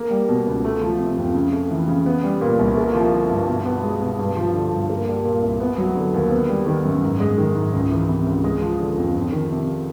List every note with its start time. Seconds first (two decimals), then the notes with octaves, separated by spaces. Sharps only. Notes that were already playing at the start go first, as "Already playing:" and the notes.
Already playing: A#3
0.11 G3
0.29 B2
0.47 C#2
0.65 A3
0.81 F3
0.99 C3
1.18 F2
1.35 C#3
1.53 A3
1.71 E3
1.88 C#3
2.06 B3
2.23 G3
2.41 A#2
2.59 C2
2.77 A#3
2.94 F3
3.12 D3
3.30 G2
3.48 B2
3.65 B3
3.83 G#3
4.01 B2
4.19 G2
4.37 F3
4.54 D3
4.72 G2
4.90 A#3
5.07 G3
5.24 A#2
5.43 C2
5.60 B3
5.78 F#3
5.96 D3
6.14 D#2
6.31 B3
6.49 G3
6.67 D#3
6.85 F#2
7.02 G#2
7.20 G#3
7.38 D#3
7.55 G#2
7.73 C#2
7.90 E3
8.09 C3
8.27 C#2
8.44 G#3
8.62 F3
8.80 D3
8.98 F2
9.15 F2
9.32 D#3
9.51 C3